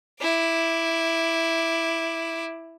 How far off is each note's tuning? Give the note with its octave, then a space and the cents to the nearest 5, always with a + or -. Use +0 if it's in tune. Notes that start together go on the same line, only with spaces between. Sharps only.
E4 +0 D6 +0